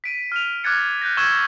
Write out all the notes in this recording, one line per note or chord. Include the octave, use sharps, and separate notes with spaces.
B6 D7 D#7
F6 D#7 F7
D6 F6 F#6 G#6 A6 C#7
F#6 G6 A#6
C#6 E6 G#6 E7 G7